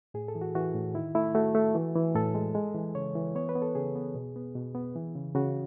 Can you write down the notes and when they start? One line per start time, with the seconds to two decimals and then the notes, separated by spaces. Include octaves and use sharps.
0.14 A2 G#4
0.28 A4
0.35 E3
0.41 F#4
0.55 E3 F#4
0.75 A2
0.94 D#3 E4
1.15 A3 E4
1.35 A3 F#4
1.55 A3
1.75 E3
1.96 E3
2.15 A2 A4
2.35 G#3
2.55 G#3
2.75 E3
2.95 C#3 C#5
3.15 E3
3.35 B3 C#5
3.49 B4
3.56 B3
3.62 A4
3.75 C#3 G#4
3.95 B3
4.15 B2
4.36 B3
4.55 B2
4.75 B3
4.96 E3
5.16 C#3
5.35 C#3 F#4